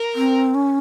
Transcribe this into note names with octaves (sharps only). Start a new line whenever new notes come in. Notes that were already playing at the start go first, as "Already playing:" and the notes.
Already playing: A#4
C4
C#4